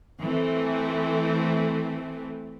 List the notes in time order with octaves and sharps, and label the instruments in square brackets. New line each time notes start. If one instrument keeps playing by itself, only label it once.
[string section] E3 A3 C4